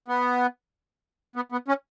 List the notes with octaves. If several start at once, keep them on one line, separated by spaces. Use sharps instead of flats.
B3
B3
B3
C#4